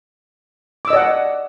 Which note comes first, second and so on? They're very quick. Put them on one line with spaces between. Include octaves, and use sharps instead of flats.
D6 E6 D#5 D5 F#5